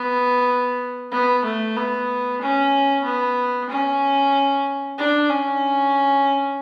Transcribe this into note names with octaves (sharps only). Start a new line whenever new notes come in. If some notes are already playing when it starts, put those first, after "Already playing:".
Already playing: B3
B3
A3
B3
C#4
B3
C#4
D4
C#4